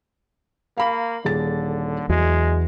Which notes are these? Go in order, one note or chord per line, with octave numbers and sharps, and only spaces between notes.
A#3 F5 B5
D#1 D3 G#4 A6
E2 F#3 G#3 G#4